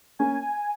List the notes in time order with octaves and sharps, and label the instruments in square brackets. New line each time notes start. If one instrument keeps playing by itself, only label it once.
[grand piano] A#3 C#4 [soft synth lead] G#5